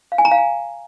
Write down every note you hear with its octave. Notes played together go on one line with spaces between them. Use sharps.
F5
G#5
A#5
F5
G#5